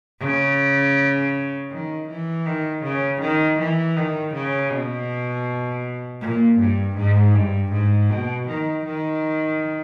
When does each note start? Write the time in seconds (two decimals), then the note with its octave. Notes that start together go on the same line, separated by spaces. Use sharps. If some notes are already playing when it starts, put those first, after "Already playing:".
0.20 C#3
1.71 D#3
2.09 E3
2.46 D#3
2.83 C#3
3.22 D#3
3.59 E3
3.96 D#3
4.34 C#3
4.71 B2
6.22 A#2
6.60 G2
6.98 G#2
7.35 G2
7.73 G#2
8.10 B2
8.48 D#3
8.86 D#3